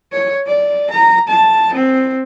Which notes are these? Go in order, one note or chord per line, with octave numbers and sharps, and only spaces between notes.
C#5
D5
A#5
A5
C4